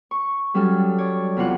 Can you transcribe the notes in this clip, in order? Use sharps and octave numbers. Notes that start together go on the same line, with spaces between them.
C#6
F#3 G3 C#4 A4 F6
C#5 D5
E2 C3 F4 F#5